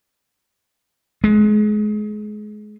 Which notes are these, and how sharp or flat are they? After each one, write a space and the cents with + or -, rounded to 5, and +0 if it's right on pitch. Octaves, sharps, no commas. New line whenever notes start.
G#3 +25